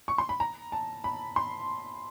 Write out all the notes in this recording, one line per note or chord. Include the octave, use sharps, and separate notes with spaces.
C#6
C6
B5
A#5
A5
B5
C6